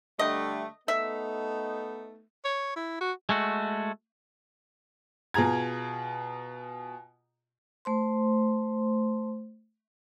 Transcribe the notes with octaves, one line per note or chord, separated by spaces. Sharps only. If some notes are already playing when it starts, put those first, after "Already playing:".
D3 G3 A3 D#5
A3 B3 D#4 E5
C#5
E4
F#4
G#3 A3 F#4
B2 F4 G#4 A#5 G#6
A3 C5 C6